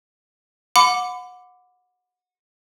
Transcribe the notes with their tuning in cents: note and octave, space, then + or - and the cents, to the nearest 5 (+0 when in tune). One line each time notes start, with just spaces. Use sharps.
F#5 -25 B5 +30 D6 +0